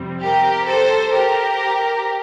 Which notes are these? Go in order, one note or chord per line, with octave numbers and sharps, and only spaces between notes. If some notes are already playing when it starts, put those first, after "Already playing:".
Already playing: F2 C3 G3 C4
G4 A#4
A4 C5
G4 A#4